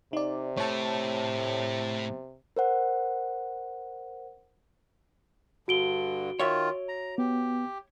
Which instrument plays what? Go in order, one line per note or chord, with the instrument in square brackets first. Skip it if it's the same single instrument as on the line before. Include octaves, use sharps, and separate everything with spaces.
[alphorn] C3 [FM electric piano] D#4 D5
[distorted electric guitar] A2 A3 [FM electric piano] C#5 A5
[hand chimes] A#4 C5 F#5
[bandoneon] G2 D3 [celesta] F#4 D7 G7
[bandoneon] D#3 F4 [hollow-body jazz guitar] C#5 E5
[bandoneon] A#5
[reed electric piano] B3 [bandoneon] G4